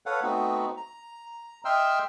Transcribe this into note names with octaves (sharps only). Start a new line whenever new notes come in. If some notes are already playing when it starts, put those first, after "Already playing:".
A4 B4 C#5 F5 F#5
A3 B3 C4 D#4 F#4
A#5
D#5 E5 G5 C6 E6 F6